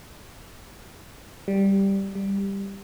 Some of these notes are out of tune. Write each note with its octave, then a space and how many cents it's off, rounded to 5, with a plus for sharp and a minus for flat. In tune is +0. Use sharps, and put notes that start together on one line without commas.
G3 +0
G3 +10